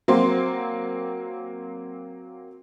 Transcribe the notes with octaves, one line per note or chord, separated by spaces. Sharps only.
F#3 A#3 C4 C6